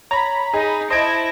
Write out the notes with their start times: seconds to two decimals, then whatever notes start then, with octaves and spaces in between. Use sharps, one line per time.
0.11 C#5 A#5 B5
0.54 D#4 G#4 D#5
0.90 E4 C5 D#5 A5 G#6 A#6 D7